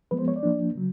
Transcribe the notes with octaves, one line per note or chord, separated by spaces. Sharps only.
F3 G#3 B3 B4
C5
C#5
D5
F3 A#3 D4
C#3 F#3